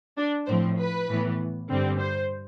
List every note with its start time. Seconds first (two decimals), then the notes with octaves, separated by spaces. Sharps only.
0.17 D4
0.47 A2 F3 C4 C5
0.78 B4
1.08 A2 E3 B3
1.69 G2 D3 G3 C4
1.99 C5